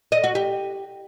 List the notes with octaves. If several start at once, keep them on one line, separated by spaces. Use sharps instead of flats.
D#5
F#4
G4